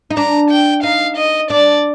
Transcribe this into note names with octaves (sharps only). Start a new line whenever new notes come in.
D#4
D4 A#5
G5
D#4 F5
D#5
D4 D5